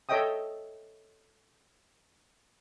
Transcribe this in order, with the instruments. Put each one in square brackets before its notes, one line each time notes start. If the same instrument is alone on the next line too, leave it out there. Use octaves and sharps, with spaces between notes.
[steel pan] A4 C#5 D#5 E5 G5 D#6